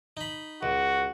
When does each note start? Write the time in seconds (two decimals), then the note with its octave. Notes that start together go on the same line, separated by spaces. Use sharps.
0.17 D#4 B5
0.63 C#2 F#4